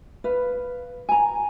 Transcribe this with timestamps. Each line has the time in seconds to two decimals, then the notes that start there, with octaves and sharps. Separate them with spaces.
0.24 B4 F5
1.09 G#5 A#5